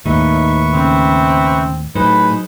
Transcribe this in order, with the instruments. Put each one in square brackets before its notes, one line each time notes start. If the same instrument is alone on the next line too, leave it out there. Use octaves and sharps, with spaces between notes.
[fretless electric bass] D#2 A2 [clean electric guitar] D#4 [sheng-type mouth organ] B4 E5 C#6
[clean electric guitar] C#3 [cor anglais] C4
[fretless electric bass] A2 [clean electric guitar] F#3 D#4 C5 [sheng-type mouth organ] G#4 B5 [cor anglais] B4